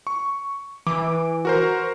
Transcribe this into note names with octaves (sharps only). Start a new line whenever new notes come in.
C#6
E3 D6
F#4 A#4 C5